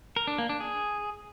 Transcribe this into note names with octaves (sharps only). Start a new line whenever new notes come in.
A#4
D4
A#3
D4
G#4